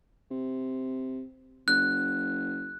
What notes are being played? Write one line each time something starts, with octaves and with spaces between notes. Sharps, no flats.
C3
F#1 F#6